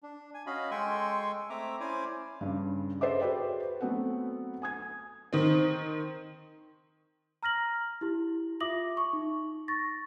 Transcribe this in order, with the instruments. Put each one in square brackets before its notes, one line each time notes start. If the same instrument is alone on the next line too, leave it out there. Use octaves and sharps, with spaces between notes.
[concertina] D4
G#5
C#4 F#4 D#5 F5 B5
G#3 A4 G5 G#5 C6 C#6
A3 C4 E5 A#5 D6
C#4 E4 C5 D5 G#5 D6
[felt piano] G2 C#3
G#4 A4 C5 D#5 E5 D6
F#4 G#4 B4 C5 D5 G5
F#3 A3 B3 C4 A4 F#5
G#5 D#6 G#6
[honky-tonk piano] D#3 C4
[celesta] A#5 F6 A#6 F#7
E4 G4
F4 E5 D6 D#6 A#6 F#7
C#6
D#4
C#6 A6 A#6